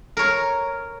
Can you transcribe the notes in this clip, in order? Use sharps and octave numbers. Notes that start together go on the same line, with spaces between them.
A#4 C#5